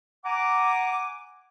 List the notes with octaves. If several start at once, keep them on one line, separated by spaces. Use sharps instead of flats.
F#5 G#5 A#5 D6